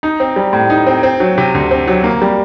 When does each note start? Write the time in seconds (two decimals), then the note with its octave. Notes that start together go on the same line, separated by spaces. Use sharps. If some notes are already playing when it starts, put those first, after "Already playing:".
0.03 D#4
0.20 C4
0.36 G3
0.53 A2
0.70 D#4
0.87 C4
1.03 C4
1.20 F#3
1.38 C3
1.55 D2
1.71 C4
1.88 F#3
2.04 A#3
2.22 G3